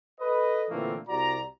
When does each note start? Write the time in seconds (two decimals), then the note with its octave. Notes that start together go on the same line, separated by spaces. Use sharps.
0.21 A4 B4 D#5
0.70 A#2 D3 E3 A3 A#3 C4
1.08 C2 C3 F#4 D5 A#5